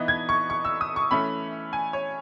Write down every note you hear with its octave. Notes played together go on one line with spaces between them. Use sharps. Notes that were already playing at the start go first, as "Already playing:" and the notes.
Already playing: E3 B3 D#4
G#6
C#6
C#6
E6
D#6
C#6
E3 A3 C#4 B5
G#5
C#5